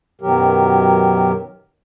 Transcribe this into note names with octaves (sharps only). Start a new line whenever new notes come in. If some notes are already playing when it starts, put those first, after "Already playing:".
F#2 B2 D#3 F#3 G4 A#4